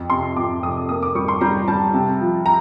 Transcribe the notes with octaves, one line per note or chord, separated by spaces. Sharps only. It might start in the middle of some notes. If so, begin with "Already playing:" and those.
Already playing: F2
C3 C6
F2 D6
F1 D#6
A#3 D#6
D6
G3 C#6
C6
G3 A#5
G3 A5
C3
F3
A#5